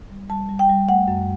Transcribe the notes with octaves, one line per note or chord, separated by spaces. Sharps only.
G3
G3 A5
G3
G5
G3
A3 F#5
F#2